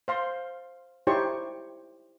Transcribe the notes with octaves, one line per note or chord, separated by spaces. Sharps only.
C5 F5 C6
D#4 E4 G4 C5 C#5 C#6